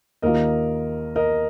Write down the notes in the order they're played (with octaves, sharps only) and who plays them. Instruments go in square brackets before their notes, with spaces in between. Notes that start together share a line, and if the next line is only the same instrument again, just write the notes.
[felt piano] D#2 D#3 A#3 F4 [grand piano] A#4 D#5
[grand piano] A#4 D#5